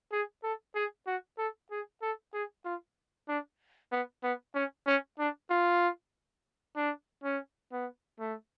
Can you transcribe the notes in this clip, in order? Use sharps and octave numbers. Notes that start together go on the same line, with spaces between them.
G#4
A4
G#4
F#4
A4
G#4
A4
G#4
F4
D4
B3
B3
C#4
C#4
D4
F4
D4
C#4
B3
A3